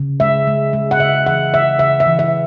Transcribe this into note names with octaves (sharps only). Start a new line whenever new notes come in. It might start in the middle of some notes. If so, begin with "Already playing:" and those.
Already playing: C#3
G#3 E5
G#3
G#3
F#5
C#3 E5
E3 F#5
C#3 E5
C#3 E5
E5
E3
E5